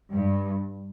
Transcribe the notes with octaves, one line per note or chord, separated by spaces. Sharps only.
G2